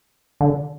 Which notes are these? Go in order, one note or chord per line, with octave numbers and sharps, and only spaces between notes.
D3